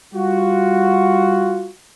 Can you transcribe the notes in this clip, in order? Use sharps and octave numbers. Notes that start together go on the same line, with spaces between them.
G3 F4 F#4